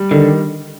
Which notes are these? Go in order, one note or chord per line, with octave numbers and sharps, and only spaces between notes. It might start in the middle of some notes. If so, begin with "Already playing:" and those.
Already playing: G3
D3 D#3